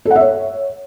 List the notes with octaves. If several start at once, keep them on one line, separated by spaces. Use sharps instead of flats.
A4
F#5
E5
C#5